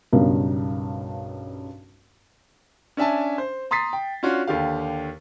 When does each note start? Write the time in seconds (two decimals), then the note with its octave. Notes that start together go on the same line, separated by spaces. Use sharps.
0.13 B1 G2 C#3 A#4
2.97 C#4 D4 E5 G#5 A5
3.38 C5
3.71 A#5 C6 D#6 A6 B6 C7
3.93 G5
4.23 C#4 D4 F4 F#4 C#5
4.47 D#2 D3 G4 F5